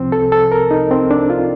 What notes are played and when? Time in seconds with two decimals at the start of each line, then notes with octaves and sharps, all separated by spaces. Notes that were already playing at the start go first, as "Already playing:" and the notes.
Already playing: C2 C3 F3 C4
0.12 A4
0.32 A4
0.52 A#4
0.71 D#4
0.91 C4
1.11 D4
1.30 F4